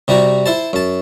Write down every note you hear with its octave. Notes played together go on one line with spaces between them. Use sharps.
C3 G3 F#4 A#5
E4 C5 A5
F#2 A5